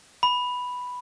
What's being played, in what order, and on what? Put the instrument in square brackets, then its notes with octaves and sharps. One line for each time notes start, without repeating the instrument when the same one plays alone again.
[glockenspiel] B5